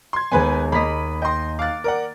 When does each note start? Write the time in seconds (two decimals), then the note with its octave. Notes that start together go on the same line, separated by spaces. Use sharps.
0.13 C6 G#6
0.31 D#2 G#3 B3 B4 C5 G#5
0.72 A#3 D#5 B5 B6
1.22 D#5 G5 C6 A#6
1.59 F5 D6 F#6 A6
1.84 A#4 D5 F#5